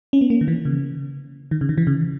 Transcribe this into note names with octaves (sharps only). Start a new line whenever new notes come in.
C#4
B3
A#3
D#3
E3
C#3
D#3
C#3
D#3
E3
C#3